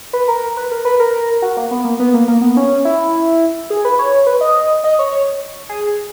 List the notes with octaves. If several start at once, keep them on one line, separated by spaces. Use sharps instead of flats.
B4
A#4
B4
A#4
B4
A#4
F#4
A#3
B3
A#3
B3
A#3
A#3
B3
C#4
E4
G#4
B4
C#5
B4
D#5
D#5
C#5
C#5
G#4